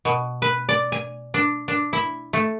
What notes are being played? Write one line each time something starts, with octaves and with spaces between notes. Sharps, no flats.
B2
B4
D5
G#5
D4
D4
E4
A3